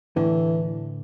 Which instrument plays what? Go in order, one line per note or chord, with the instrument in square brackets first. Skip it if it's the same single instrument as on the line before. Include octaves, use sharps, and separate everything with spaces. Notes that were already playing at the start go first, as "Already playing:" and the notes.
[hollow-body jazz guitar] A2 D3 [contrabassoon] E3